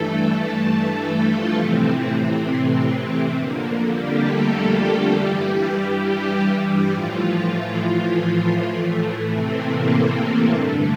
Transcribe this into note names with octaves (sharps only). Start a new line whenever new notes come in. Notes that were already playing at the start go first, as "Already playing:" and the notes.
Already playing: G2 E3 A3 A4
A3 A4
F3 F4
A2 C3 E3 C4
F2 D3 A#3
A#3
G3 G4
A3 A4
G3 G4
G3 G4
G2 E3
A2 E3 F3 F4
A2 E3 A3
C3 C4
A#3
G2 D3 A3